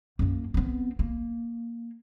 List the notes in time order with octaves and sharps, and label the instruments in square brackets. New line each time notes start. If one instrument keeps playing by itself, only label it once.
[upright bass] F#2 A#3
B3 C4
A#3